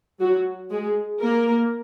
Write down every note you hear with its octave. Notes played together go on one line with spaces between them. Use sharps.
F#3 F#4
G#3 G#4
A#3 A#4